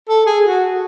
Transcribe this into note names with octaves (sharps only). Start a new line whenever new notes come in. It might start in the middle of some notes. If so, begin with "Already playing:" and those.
A4
G#4
F#4